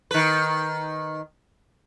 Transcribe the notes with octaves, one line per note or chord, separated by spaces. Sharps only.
D#3 B4